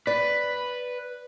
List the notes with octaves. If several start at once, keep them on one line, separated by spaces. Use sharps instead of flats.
B4 D5